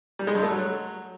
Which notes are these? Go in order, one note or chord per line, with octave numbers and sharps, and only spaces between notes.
G3
G#3
G2
A3
F#3